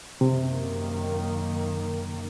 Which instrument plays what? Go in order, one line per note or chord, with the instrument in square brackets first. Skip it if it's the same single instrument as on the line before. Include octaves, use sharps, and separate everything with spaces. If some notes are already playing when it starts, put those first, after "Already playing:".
[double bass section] F#2 D#3 A#3 [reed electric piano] C3